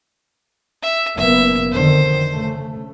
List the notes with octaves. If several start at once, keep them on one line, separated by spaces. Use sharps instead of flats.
E5
F#1 A#3 B3 E5
F2 D3 D#3 C5
C#3 A3